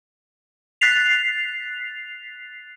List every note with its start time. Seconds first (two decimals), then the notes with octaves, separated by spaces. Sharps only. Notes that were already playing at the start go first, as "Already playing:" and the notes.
0.81 F#6 A6 B6 C7 F7